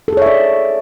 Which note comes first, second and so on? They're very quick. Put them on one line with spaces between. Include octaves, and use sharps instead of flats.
A4 G#4 C#5 E5 D5